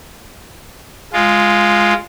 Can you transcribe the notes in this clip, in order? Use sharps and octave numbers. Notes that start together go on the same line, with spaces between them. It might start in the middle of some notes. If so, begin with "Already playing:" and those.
G#3 F4